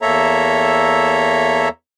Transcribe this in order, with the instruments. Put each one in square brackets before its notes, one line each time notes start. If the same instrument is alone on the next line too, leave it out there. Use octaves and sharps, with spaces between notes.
[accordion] E2 A#3 A4 C#5 E5 A#5